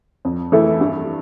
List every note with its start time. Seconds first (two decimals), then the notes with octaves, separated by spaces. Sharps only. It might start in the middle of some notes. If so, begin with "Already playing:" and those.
0.25 F2
0.52 E3 A3 E4 A4
0.81 G2